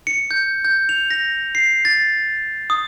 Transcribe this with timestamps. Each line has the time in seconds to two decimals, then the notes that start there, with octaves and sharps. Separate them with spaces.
0.07 C#7
0.31 G6
0.65 G6
0.89 F7
1.10 A#6
1.55 C7
1.85 A6
2.70 D#6